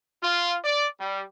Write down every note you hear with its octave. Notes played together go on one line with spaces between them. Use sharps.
F4
D5
G3